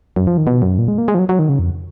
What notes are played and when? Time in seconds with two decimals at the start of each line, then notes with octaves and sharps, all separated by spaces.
0.16 F#2
0.27 F3
0.37 D#3
0.47 B2
0.62 F#2
0.78 A#2
0.88 G#3
0.98 A#3
1.08 G#3
1.15 F3
1.19 F#3
1.29 F#3
1.39 D#3
1.49 C#3
1.59 F2